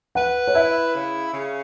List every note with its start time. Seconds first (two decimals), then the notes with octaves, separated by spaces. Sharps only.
0.15 B4 F#5
0.48 C#5
0.54 E4 E5
0.94 C#3
1.33 C#3